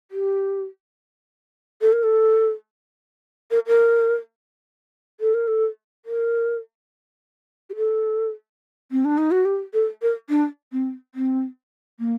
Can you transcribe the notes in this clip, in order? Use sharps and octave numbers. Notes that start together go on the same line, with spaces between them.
G4
A4
A#4
A4
A#4
A#4
A4
A#4
A4
A#4
G4
A4
C4
D4
D#4
F#4
G4
A4
A#4
D4
C4
C4
A#3